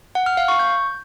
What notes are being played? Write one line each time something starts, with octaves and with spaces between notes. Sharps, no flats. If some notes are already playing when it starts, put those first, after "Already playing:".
F#5
F6
F5
C#6
G6